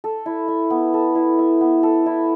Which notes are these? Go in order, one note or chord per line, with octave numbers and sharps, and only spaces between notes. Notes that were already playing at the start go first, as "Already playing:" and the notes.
A4
E4
E5
B3
A4
E4
E5
B3
A4
E4